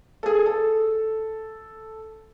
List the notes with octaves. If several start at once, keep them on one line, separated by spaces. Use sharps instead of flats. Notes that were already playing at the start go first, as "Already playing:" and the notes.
G#4 A4
A4